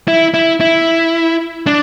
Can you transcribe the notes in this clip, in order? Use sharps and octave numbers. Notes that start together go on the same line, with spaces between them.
E4
E4
E4
D4